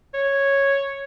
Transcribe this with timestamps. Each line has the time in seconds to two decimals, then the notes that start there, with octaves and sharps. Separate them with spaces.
0.14 C#5